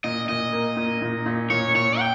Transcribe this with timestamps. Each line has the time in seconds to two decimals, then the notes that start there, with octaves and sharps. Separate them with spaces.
0.04 A#2 D#5
0.29 A#2 D#5
0.53 A#3
0.77 A#2
1.02 A#2
1.26 A#2
1.50 A#2 C#5
1.74 A#2 C#5
1.99 G5